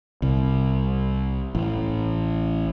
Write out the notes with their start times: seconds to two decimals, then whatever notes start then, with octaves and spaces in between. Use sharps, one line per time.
0.22 C2
1.55 A1